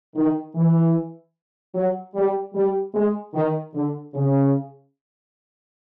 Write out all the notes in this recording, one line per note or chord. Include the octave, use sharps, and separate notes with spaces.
D#3
E3
F#3
G3
G3
G#3
D#3
D3
C#3